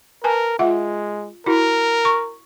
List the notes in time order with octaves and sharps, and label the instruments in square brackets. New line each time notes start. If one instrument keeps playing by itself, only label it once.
[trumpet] A#4 [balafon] B4 G#5 A5
[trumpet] G#3 [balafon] F4 E5 F#5
[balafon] E4 F#4 [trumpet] A#4
[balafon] C#6